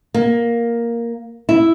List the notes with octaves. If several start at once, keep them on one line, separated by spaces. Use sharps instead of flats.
A#3
E4